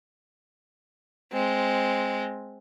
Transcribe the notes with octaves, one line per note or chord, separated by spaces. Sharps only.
G#3 C4